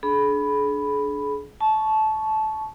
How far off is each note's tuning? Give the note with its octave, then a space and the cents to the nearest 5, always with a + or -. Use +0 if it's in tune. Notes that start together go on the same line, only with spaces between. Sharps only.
D4 +0 G#4 +40 B5 +0
A5 -15 C#6 +0